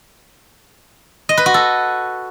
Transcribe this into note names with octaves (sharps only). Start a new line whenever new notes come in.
D#5
B4
F#4
A4